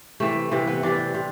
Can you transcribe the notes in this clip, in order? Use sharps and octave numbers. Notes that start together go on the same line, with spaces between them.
C3 E3 A3
C3 E3
B3
C3 E3 D4
C3